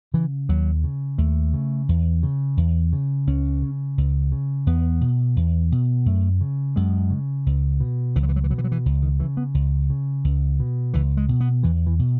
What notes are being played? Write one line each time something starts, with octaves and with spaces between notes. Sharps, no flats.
C#3 E3
D#2 F#3
C#3
D#2 A3
C#3
E2
C#3
E2
C#3
C#2 C#4
C#3
C#2
C#3
E2 B3
B2
E2
B2
F#2 A3
C#3
F#2 G#3
C#3
C#2
B2
C#2 E3
F#3
E3
F#3
E3
B2 F#3
E3
F#3
E3
C#2
D#3
C#3 E3
B3
C#2
C#3
C#2
B2
C#2 E3
G#3
B2
B3
E2 E3
E3
B2